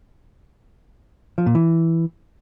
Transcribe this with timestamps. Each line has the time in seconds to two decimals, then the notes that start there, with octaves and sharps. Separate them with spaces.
1.38 F3
1.46 A#2
1.55 E3